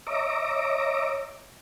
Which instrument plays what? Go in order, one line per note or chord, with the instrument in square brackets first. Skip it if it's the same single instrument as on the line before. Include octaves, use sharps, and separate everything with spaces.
[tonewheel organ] C#5 D#5 E5 A#5 D6